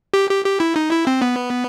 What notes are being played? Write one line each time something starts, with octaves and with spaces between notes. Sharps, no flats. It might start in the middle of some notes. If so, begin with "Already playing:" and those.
G4
G4
G4
E4
D#4
E4
C4
B3